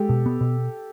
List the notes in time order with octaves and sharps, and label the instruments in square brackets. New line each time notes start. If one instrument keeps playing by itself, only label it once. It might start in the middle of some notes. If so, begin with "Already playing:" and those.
Already playing: [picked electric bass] G#3 [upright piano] G4 A4
[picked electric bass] B2
B3
B2